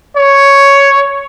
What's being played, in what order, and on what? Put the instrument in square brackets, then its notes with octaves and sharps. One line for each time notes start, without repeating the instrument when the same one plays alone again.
[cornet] C#5